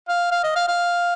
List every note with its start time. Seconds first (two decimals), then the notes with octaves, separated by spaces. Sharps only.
0.08 F5
0.32 F5
0.44 D#5
0.56 F5
0.68 F5